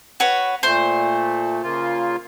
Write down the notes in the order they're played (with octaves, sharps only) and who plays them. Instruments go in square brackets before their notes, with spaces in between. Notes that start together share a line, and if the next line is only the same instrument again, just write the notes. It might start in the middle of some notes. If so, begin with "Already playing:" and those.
[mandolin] F#4 B4 C#5
[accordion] A#2 A3 [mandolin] C5
[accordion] C#3 A#3 F4